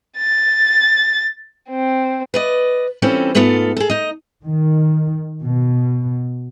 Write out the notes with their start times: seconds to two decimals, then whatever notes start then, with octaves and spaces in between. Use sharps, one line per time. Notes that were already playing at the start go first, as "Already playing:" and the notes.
0.17 A6
1.69 C4
2.34 B4 D5 D#5
3.02 E3 G3 C4 C#4 F4 A4
3.35 G#2 A3 B3 F4 A4 F5
3.77 G#4 A4
3.90 D#4 D#5
4.44 D#3
5.43 B2